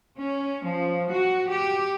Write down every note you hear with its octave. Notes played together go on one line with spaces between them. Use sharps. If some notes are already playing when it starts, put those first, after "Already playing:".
C#4
F3
F#4
G4